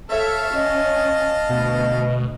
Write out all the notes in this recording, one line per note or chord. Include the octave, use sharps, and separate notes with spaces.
A4 C#5 E5 F5 A5
C#4 D#5
D2 B2